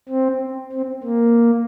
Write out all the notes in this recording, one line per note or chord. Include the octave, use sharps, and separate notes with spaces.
C4
C4
A#3